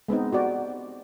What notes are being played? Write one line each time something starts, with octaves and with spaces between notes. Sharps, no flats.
G#3 B3 C4 D#4
F#4 G4 D5